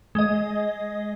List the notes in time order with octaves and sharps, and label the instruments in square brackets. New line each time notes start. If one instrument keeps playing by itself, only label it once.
[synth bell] G#3 D#5